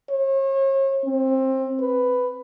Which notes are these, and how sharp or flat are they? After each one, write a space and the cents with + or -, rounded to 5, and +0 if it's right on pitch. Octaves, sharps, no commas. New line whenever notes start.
C#5 -40
C4 +20
B4 +10